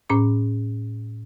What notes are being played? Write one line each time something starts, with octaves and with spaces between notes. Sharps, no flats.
A2 C#4 D6